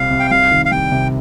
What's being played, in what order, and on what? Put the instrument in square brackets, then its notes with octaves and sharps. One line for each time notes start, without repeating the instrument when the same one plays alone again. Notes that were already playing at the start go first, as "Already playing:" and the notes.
Already playing: [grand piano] C2 G3 C4 [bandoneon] F5
[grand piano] C3
[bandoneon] G5
[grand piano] C2 [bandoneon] F5
[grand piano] D#3
[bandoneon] F5
[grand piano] G3 [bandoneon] G5
[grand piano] C3